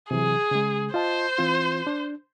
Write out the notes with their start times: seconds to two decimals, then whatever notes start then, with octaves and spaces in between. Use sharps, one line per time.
0.11 C3 E3 F#3 G#4
0.51 C#3 G#3
0.94 F4 C5 D#5 A5
1.38 E3 C4 F4
1.87 D4